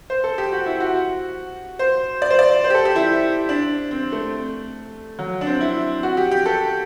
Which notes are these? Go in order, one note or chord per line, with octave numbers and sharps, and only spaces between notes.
C5
A4
G4
F#4
E4
F#4
C5
D5
C5
D5
C5
G4
A4
G4
E4
D4
C4
A3
F#3
D4
C4
E4
F#4
G4
G4
A4